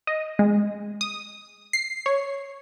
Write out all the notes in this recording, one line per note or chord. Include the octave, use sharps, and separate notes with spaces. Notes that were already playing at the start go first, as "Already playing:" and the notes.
D#5
G#3
D#6
C7
C#5